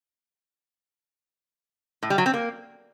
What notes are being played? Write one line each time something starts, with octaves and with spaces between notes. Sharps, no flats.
A2
G3
F#3
C4
A#3